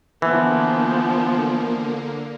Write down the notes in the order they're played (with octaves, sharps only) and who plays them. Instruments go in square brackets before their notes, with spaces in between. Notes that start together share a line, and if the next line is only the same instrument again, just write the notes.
[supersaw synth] D3 A#3 [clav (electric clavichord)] E3 [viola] F3 B3